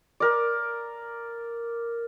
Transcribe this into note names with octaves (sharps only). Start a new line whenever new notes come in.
A#4 D5